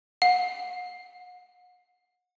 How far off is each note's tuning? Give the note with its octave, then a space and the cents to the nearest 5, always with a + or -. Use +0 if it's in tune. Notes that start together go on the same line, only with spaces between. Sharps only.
F#5 -35